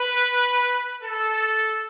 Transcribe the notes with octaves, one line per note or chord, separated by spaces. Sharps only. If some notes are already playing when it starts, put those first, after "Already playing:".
Already playing: B4
A4